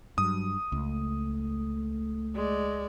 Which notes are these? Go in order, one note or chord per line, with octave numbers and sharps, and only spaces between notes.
G2 F#3 D#6
C#2 A3
G#3 D5